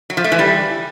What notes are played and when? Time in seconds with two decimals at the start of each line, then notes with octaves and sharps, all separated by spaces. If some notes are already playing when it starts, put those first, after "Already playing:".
0.10 F#3
0.17 F3
0.24 A3
0.32 E3
0.39 G3